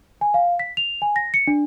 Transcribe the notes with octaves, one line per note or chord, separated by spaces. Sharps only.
G#5
F5
B6
F7
G#5
A#6
C#7
D4